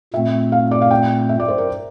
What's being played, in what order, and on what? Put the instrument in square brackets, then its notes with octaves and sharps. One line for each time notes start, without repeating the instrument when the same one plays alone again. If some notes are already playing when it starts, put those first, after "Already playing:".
[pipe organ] A#2 A3 C4 [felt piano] E5
[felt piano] F5
D5
F5
G5
E5
D5
C5
A#4